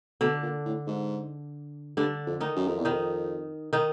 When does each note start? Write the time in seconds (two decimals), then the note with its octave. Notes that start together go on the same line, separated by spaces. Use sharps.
0.21 B2 D3 D4
0.42 A#2
0.66 A2
0.87 G#2
1.97 G2 D3 D4
2.27 F2
2.40 D#3 D#4
2.56 F#2
2.67 F2
2.78 E2
2.85 D#3 D#4
2.90 F2
3.73 D#3 D#4